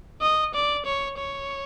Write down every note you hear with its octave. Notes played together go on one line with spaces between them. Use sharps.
D#5
D5
C#5
C#5